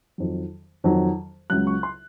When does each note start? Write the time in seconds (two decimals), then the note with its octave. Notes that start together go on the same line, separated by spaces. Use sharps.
0.18 F2 D#3 F#3
0.84 F2 D#3 F#3
1.50 C#2 C#3 F#3 F#6
1.67 C#6
1.83 C6